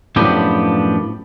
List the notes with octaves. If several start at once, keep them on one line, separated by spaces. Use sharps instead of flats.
F#2 A2 F3 B3 D4 G4